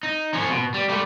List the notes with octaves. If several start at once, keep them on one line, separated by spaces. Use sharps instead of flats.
D#4
F3 C#4
B2
G3
G3 A3